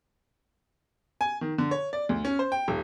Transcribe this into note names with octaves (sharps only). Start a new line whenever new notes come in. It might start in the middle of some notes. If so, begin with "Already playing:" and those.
G#5
D#3
D3
C#5
D5
D2
C#4
C5
G5
D#1